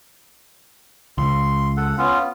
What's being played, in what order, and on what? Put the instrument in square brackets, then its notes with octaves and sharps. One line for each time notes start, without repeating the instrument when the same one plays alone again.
[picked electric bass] C#2 [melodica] C6
[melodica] A4 F#5
B3 C#4 F4